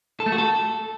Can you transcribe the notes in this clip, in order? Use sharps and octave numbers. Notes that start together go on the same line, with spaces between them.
A4
A3
F#4
A4